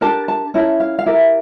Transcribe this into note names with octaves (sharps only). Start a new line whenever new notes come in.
D4 G4 A#4 A5
A5
C#4 E4 A#4 A5
F5
F5
E4 G4 A#4 E5